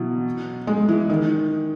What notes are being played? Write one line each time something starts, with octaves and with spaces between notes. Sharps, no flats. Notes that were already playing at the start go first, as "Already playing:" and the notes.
Already playing: B2 E3 F#3
G#3
E3
D#3